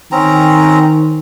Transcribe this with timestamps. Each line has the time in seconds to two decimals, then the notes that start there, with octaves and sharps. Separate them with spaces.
0.12 D#3 C4 C#4 A#5